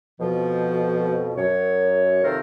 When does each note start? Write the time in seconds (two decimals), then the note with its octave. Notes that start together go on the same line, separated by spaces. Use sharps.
0.20 F2 B2 F3
1.37 F#2 C#5
2.23 C3 D#3 F3 A4 A#4 C5